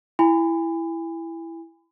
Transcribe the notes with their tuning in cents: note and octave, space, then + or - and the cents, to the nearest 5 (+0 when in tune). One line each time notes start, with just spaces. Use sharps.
E4 +10 G#5 -35 B5 +35